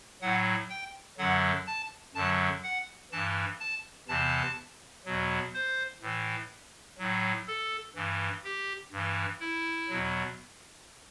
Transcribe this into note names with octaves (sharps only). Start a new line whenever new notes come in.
A2 F#3 F#5
G5
F#2 D3 F#3 F#5
A5
F#2 D3 F#3 A5
F#5
G2 E3 A5
A5
E2 C3 E3 A5
E2 B2 F#3
C5
A2 E3
A2 F#3
A4
G2 E3
G4
G2 E3
E4
E2 B2 F#3